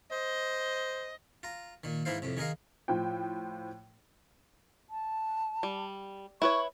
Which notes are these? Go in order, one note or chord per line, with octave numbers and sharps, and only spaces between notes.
C5 D#5
F4 A#5
A#2 D#3
G#2 E3 D#4 E4 C5 F5
F2 A2 C3
D#3 G#4 A#4 D#5 F5
A2 F3 G5
A5
G3
E4 B4 C#5 C#6